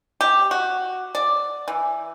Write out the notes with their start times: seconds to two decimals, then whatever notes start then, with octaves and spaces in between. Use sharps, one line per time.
0.21 G4
0.51 F#4
1.15 D5
1.68 E3